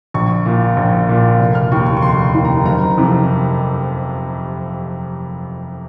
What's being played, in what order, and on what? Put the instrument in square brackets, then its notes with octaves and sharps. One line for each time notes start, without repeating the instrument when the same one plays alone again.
[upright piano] A#1 C#6
A#2
A#1
A#2
F1
F6
D#2 D#3 C#6
C#6
C#6
F1 C6
D#2 D#3
A#5
F#1 A#5
F2 C3 D#3